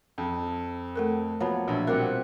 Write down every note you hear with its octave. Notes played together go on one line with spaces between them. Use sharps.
F2
A3 A4 A#4
F3 F#3 A#3 B3 C#5
A#1 B2 E5
G3 C4 F4 G4 A#4 F5 F#5